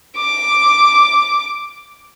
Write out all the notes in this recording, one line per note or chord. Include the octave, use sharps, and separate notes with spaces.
D6